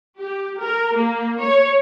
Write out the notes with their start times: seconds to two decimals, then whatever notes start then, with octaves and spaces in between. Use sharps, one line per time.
0.20 G4
0.61 A#4
0.94 A#3
1.42 C#5